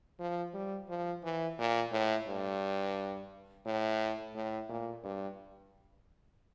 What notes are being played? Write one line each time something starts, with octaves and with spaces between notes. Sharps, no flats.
F3
G3
F3
E3
A#2
A2
G2
A2
A2
A#2
G2